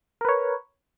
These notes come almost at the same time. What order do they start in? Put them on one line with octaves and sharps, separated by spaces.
A#4 B4 C#5